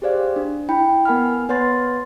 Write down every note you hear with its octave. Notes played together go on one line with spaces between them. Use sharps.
G4 G#4 C5 D5 F5
D4
E4 G5 B5
B3 A#4 F#5 G#5 B5 F6
B3 B4 C#5 F#5 C6 A6